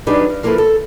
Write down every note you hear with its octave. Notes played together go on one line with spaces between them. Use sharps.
F#3 D4 D#4 G4 G#4 B4
G2
F3 A#3 E4 G#4 A4 B4
A4